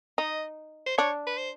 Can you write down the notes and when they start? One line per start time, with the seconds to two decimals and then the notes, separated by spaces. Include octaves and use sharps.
0.18 D#4 D#5
0.86 C5
0.98 D4 C#5
1.27 B4
1.38 C5